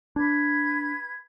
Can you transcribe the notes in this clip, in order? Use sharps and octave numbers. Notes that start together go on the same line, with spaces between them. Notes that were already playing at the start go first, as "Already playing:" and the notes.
D4 B4 G#6